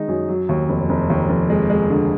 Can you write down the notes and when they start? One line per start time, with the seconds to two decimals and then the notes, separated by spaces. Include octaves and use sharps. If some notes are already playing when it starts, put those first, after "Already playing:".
Already playing: D#3 G#3 D#4
0.08 F#2
0.29 F#3
0.49 D#2
0.69 F1
0.89 F1
1.10 D#2
1.29 F1
1.50 G#3
1.70 G#3
1.90 D3